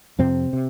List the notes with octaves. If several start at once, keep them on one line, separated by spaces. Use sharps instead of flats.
F2 C3 C4
C3